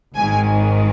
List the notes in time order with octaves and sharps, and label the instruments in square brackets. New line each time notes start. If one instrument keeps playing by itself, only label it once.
[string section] G#1 G#2 D#3 G#5